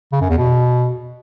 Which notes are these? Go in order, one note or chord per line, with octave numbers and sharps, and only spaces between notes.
C#3
F#2
E2
B2